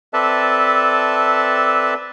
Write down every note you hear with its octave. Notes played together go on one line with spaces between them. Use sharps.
C4 A4 B4 D5 E5 A5